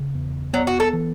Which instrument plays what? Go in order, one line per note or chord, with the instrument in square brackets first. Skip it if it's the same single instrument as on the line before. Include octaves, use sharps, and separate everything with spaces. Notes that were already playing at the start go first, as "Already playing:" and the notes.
Already playing: [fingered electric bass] C#3
E2
[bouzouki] F#3 [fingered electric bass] B3
[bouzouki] F#4
A4
[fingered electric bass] E3